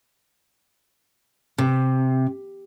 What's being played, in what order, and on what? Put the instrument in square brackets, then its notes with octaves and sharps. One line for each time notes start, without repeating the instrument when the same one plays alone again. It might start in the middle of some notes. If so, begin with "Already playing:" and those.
[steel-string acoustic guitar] C3